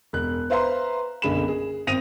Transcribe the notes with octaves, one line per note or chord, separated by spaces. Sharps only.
E1 F#6
B4 C5 E5 F5 A#5 C6
F#1 B1 D3 G#4 B5 E7
G#4
G#1 C4 D#6 A#6 D#7 F7